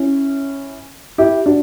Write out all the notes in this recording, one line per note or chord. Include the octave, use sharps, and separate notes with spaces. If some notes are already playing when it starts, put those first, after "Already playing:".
Already playing: C#4 E4
E4 G4
D4 F#4